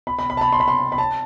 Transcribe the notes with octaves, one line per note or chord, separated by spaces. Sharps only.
B5
B5
B5
A5
B5
C6
B5
C6
B5
A5